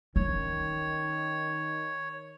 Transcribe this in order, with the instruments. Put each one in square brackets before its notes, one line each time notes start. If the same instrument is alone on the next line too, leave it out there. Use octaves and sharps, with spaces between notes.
[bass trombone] D#3 [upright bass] C#4 [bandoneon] C#5